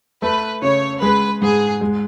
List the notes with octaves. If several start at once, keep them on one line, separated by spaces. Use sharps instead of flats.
A3 B4
C#3 C#5
G#3 B4
G#2 G#4
G#3